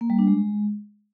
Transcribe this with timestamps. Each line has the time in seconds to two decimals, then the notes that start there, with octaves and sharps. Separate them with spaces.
0.01 A#3
0.10 G3
0.19 D4
0.27 G#3